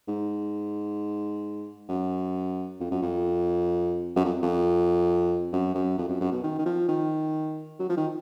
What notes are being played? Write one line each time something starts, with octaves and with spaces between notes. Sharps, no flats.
G#2
F#2
F2
F#2
F2
F#2
F2
F2
F#2
F#2
F2
F#2
F#2
B2
D#3
D#3
F3
D#3
F#3
F3
D#3